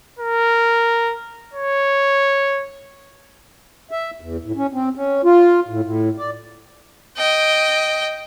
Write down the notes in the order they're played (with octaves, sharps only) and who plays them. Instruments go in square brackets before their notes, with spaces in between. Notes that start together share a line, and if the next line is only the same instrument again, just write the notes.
[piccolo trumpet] A#4
C#5
[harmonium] E5
E2
A2
C#4
C4
C#4
F4
A2
A2
D5
[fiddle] D#5 G5